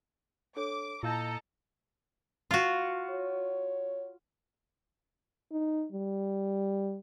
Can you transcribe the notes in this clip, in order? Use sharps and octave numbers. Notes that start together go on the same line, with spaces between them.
D4 A4 C#5 D6
A#2 E4 A4 D#5 F5 A5 A#5 G6
F4 F#4
C#5
D#4
G3